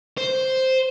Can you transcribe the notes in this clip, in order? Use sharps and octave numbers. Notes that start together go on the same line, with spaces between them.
C5